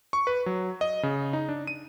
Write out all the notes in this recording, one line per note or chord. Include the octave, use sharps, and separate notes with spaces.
C#6
B4
F#3
D#5
C#3
D#4
D4
D#7